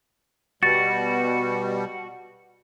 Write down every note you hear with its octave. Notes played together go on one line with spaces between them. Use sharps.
B2 G3 F#4 A6